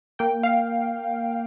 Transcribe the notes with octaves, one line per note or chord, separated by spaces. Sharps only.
A#3 G5
F5